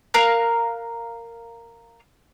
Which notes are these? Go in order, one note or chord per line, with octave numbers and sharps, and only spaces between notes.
A#4 F5 A#5 F#6